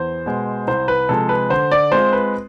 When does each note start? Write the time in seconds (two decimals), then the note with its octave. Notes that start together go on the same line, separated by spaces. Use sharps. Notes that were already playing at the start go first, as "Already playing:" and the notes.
Already playing: E2 C5
0.26 B2 G#3
0.67 C2 C5
0.88 B4
1.09 C3 F3 G#3 A4
1.29 B4
1.50 D3 C5
1.71 D5
1.92 G#3 C4 F4 C5
2.13 B4